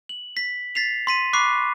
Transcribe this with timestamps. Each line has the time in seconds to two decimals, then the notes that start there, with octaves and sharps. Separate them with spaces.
0.09 F#7
0.37 B6
0.75 A6 B6 C7 F7
1.07 C6 B6 D#7
1.33 B5 C#6 D6 F#6 C7